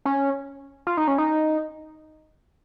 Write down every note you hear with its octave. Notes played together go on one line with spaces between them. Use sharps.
C#4
F4
D#4
C#4
D#4